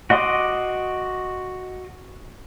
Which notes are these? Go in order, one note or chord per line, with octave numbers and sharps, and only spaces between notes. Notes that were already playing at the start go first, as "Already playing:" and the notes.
F#4 D#5 C6 D6 D#6